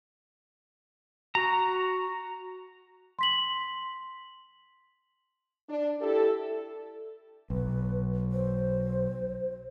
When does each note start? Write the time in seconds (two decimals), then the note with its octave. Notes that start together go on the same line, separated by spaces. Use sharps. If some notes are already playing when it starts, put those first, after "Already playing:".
1.35 F#4 A#5
3.19 C6 B6 F#7
5.68 D4
6.01 E4 G4 A4
7.50 B1 B4
8.32 C5